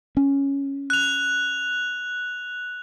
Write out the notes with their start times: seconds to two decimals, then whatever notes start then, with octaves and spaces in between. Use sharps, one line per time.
0.17 C#4
0.90 F#6 F7